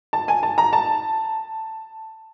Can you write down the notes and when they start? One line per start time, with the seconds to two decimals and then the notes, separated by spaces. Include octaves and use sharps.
0.13 A5
0.28 G#5
0.43 A5
0.58 A#5
0.73 A5